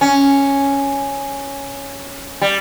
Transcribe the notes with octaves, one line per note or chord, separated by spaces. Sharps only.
C#4
G3